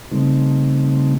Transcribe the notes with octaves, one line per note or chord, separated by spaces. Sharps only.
C#3 G3 A3 C4 D#4